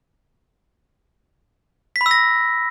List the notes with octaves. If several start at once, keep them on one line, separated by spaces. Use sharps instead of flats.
B6
B5
E6
A#6